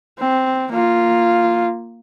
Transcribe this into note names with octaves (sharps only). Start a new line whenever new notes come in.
C4
A#3 F4